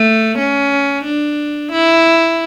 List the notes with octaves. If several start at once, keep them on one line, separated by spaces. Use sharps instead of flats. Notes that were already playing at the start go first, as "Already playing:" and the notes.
Already playing: A3
C#4
D4
E4